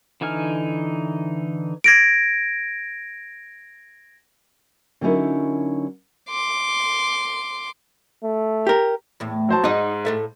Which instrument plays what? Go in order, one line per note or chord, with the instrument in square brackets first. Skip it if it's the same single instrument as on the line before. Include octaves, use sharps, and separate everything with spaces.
[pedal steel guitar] D3 E3 D#4 G#5 F6
[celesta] G#6 A#6 D7
[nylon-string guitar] D3 F#3 C#4 D#4 E4 A#4
[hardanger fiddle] C6 D6
[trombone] A3
[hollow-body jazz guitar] G4 A#4
[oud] E2 A2
[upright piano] F#3 C5 A5
[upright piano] G#2 [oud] D#4 D#5
[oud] A2 A4 E5